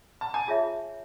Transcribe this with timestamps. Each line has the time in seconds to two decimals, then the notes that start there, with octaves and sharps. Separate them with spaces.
0.21 A5
0.34 G#5
0.48 F4 G#4 C#5 E5 A5